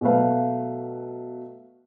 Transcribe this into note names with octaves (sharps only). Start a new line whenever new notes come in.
B2 F#3 A3 B4 F5